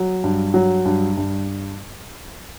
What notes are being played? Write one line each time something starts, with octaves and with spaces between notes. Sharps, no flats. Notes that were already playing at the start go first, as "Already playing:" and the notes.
Already playing: F#3
G2
F#3
G2
G2